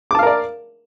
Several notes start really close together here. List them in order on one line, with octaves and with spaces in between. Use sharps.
D6 A5 F5 A#4 D5